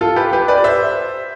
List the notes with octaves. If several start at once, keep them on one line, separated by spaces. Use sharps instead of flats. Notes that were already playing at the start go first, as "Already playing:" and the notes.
F4 A4
G4 B4
G4 B4
B4 D5
C5 E5